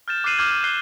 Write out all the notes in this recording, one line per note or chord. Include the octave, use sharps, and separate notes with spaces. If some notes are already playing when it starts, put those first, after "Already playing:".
F6 G6 A6 E7
D6 F6 F#6 C7 D#7 F#7
D6 F6 G6 G#6 F#7
G6
F#6 C7 G7